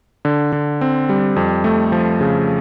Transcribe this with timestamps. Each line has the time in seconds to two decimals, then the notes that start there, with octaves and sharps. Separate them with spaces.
0.25 D3
0.52 D3
0.81 C4
1.09 G3
1.36 F2
1.64 A3
1.92 F3
2.21 C#3